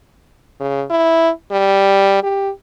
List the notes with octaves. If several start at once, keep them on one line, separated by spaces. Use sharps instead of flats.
C#3
E4
G3
G4